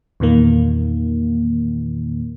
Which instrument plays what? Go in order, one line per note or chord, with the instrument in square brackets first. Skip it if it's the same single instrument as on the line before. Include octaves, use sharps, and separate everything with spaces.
[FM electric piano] E2 A#2 D#3 A#3